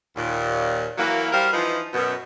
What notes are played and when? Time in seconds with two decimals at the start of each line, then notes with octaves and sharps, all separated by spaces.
0.16 D#2 A#2
0.98 E3 F#3 A#3
1.32 G3 A#4 C5 F5
1.52 E3 F3 D#4 F4 B4
1.94 F#2 B2